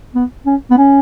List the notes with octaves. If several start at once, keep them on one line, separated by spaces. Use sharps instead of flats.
B3
C#4
B3
C#4